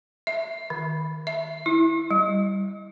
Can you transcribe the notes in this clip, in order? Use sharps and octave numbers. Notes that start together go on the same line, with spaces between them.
E5
D#3
E5
E4
G3